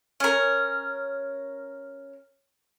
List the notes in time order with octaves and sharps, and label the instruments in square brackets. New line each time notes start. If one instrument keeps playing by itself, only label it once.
[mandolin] C#4 A#4